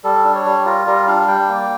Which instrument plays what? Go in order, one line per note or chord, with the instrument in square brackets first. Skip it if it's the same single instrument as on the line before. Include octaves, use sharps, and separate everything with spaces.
[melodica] G3 A4
D4
C#5
G3
F4 A#4
G3 A#4
D4 F5
G3 G5
A#3